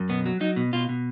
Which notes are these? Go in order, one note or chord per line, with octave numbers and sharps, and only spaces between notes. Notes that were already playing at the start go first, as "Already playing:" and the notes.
Already playing: F#2
B2 B3
F#3
F#3 D#4
B2
B2 F4
B2